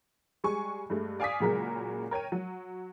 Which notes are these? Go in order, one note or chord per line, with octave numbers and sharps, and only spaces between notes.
G3 G#3 G#5 C#6
G2 G#3 A3
D5 F5 G#5 D6 D#6 B6
A#2 C#3 F#3 G#3 A#4
A#4 C#5 G5 D#7
F#3